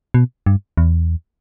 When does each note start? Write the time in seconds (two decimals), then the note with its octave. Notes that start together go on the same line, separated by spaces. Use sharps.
0.14 B2
0.46 G2
0.77 E2